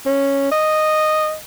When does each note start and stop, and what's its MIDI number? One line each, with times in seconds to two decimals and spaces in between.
0.06 0.47 61
0.52 1.36 75